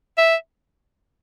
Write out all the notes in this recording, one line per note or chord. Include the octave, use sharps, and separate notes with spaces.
E5